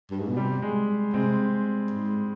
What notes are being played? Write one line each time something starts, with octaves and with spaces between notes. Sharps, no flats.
G2
G#2
B2
C3 G3
G#3
C3 G#3 C4
G#2